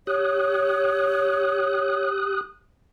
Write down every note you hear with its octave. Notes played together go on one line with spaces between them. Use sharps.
G4 C#5 D#6 F#6